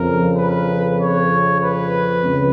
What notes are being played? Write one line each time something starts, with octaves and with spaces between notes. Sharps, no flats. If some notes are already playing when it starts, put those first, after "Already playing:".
Already playing: F2 C#3 A#4
B4
C#5
B4
C#2